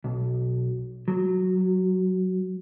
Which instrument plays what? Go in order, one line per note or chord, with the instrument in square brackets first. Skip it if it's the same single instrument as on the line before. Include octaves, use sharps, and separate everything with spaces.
[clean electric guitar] B1
F#3